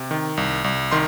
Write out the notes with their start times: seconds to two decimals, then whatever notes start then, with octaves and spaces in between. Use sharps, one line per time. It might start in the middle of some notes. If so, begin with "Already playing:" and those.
Already playing: C3
0.11 D#3
0.37 C2
0.64 C2
0.92 D#3 C6